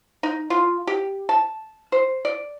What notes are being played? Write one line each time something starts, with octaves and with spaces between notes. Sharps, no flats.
D#4
F4
G4
A5
C5
D5